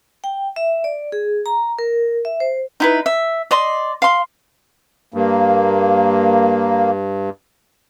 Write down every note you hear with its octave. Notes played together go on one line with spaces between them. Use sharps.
G5
E5
D5
G#4
A#5
A#4
E5
C5
D#4 E4 B4
E5
D5 D#5 C6
F5 C6
G2 A#3